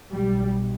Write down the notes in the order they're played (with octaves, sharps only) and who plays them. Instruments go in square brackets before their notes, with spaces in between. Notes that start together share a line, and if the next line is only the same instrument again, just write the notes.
[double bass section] B1 B2 G3